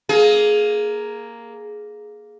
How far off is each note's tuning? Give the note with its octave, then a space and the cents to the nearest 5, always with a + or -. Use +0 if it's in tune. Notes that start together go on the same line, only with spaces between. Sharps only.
A#3 +0 G#4 +15